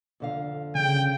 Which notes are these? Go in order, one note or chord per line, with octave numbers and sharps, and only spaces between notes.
F2 D3 F5
C#3 G5